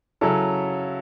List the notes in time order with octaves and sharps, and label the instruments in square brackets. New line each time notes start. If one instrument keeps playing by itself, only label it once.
[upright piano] C#3 F#3 C#4 E4 A4